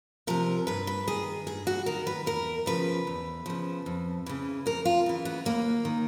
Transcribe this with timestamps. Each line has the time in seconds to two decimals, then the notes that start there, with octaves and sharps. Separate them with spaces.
0.27 C3 F3 A#4
0.67 G2 B4
0.87 B4
1.07 D#3 G#4
1.47 G2 G#4
1.67 F#4
1.86 D#3 A#4
2.07 B4
2.26 E2 A#4
2.66 C#3 F3 B4
3.07 E2
3.46 C#3 F3
3.86 F2
4.26 C#3 E3
4.66 F2 A#4
4.85 F4
5.06 C#3 E3
5.25 B3
5.45 D#2 A#3
5.85 D#3